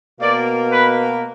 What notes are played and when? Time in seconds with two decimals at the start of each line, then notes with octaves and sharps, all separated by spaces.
0.20 B2 A#3 D5
0.72 B4